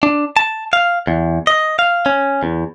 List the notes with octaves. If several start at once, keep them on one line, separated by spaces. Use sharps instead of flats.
D4
A5
F5
E2
D#5
F5
C#4
E2